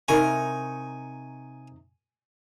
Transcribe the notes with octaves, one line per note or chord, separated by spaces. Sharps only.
C3 D#4 A#4 G#5 C#6